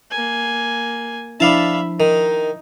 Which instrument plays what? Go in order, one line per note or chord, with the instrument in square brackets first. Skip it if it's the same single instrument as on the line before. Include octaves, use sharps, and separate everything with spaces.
[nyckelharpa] A#3 G#5
[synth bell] F3 D4 E4 [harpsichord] D5 F5 A5 [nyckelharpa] E5 B5
[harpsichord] D#3 [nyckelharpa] D#4